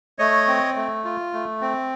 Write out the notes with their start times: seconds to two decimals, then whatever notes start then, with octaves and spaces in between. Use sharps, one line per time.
0.19 A3 C#5 D#5
0.48 C4
0.76 A3
1.05 F4
1.33 A3
1.61 C4